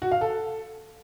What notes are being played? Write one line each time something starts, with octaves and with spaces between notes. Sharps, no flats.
F#4
F5
A4